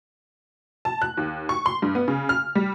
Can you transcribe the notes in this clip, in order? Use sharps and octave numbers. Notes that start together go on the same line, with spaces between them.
A5
F#6
D#2
C#6
C6
G2
B3
C#3
F6
G3